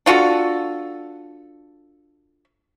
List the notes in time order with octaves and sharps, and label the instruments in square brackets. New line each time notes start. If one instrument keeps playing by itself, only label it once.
[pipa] D4 F4 F#4 A4